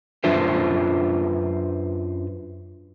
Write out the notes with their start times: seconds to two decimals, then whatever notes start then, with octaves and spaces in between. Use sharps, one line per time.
0.24 F#2 D4 F4 B4 C5 E5